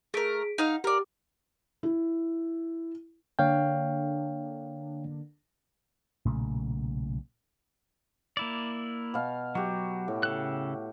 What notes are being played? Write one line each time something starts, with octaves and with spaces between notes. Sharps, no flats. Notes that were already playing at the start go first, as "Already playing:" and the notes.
A3 G#4 A#4 B6 D7
D#4 F5 F#5
G4 A#4 D5 D6
E4
D3 A#3 D4 C#5 F5 G5
B1 A#2 C#3 A3
A#3 E4 D5
B2 F5
F#3 F#4 G4
A2
C#3 A4 F#6